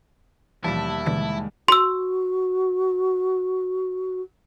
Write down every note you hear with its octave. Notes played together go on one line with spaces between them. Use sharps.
D#2 B2 E3 F3 G3 E4 A5
B2 D3 E3 G#3
F#4 C6 E6